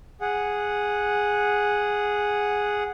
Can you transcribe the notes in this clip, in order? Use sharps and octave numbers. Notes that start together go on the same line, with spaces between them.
G#4 F#5